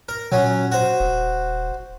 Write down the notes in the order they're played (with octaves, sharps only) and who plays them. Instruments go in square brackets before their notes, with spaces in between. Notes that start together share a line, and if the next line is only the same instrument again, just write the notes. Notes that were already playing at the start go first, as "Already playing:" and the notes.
[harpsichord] A#4
[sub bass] A#2 [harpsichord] F#3 C#4
[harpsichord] F#4 C5
[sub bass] D#1